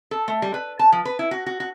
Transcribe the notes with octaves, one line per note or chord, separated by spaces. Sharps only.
A4
A3
G3
B4
A5
F3
B4
E4
F#4
F#4
F#4